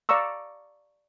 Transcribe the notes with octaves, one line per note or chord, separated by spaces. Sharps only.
D5 F5 A#5 C#6 E6